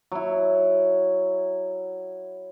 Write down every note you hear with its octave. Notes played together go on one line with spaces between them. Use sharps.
F#3 E4